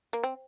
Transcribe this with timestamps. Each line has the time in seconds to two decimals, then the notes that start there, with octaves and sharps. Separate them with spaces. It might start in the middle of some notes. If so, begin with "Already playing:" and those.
0.13 A#3
0.24 C4